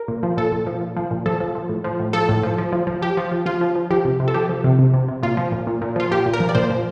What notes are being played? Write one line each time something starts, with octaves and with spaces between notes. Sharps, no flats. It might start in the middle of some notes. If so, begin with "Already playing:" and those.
Already playing: A#4
A#2
F3
A#2 A4
A#2
F3
A#2
F3
A#2
F3 A4
F3
F3
A2
F3
A2
F3 A4
A2
F3
F3
F3
F3
F3 G4
F3
F3
F3 F4
F3
F3
F3 G4
C3
C3
A4
F3 G4
F3
C3
C3
C3
C3
A#2 F4
F3
A#2
A#2
A#2
F3 F4
A#2 G4
A#2
A#4
F3
D5
A#2 C5
F3